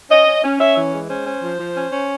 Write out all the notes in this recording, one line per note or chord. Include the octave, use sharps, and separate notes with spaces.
C#4 D#5
C#4
C#4
C#4 E5
E3
G#3
C#4 C5
C#4
F3
F3
C#4
C#4